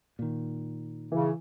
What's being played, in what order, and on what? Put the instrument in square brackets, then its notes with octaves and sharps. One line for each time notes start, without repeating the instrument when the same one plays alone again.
[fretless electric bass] A#2 D#3
[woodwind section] C#3 [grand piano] E3